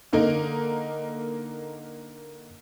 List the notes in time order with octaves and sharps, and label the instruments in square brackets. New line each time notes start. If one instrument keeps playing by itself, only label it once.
[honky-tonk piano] D3 A#3 D#4 A#4